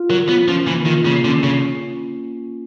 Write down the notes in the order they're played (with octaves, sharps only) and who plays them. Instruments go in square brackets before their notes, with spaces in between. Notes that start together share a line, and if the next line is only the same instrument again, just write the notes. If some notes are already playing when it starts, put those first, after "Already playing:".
Already playing: [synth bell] F4
[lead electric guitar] F#3 [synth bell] A#4
[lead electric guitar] B3 [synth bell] F4
[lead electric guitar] F3 [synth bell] C#4
[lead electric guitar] E3 [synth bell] A#3
[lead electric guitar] D#3 [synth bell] F4
[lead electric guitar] C#3 [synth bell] A#3
[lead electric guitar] D3 [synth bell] C#4
[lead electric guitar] C#3 [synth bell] C#4